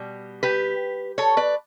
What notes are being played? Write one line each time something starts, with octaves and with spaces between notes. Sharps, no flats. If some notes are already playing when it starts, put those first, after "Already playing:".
Already playing: B2 G3
G4 B4
A4 C#5
B4 D5